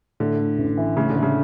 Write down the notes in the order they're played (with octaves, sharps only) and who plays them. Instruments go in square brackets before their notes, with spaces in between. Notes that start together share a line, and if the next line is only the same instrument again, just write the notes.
[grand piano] A2 [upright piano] D3
[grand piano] A3
A1
E3
[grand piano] A2 [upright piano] C#3
[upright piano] D3
[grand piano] A3
[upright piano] C#3